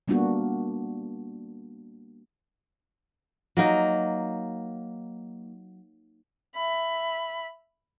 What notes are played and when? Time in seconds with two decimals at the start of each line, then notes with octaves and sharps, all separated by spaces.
0.08 G3 A#3 B3 D4 F#4
3.57 F#3 A#3 D#4
6.55 E5 B5